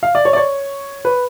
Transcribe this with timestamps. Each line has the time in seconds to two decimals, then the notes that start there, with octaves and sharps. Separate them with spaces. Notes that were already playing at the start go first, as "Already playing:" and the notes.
0.03 F5
0.15 D5
0.25 C#5
0.33 D5
0.37 C#5
1.05 B4